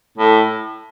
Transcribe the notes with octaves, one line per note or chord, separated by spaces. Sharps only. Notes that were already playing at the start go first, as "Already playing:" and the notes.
A2